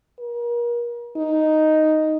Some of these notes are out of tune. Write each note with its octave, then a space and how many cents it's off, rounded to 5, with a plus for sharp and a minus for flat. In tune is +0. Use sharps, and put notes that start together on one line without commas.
A#4 +35
D#4 +0